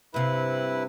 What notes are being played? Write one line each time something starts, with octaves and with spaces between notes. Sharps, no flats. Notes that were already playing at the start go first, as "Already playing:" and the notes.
G2 C3 E4 B4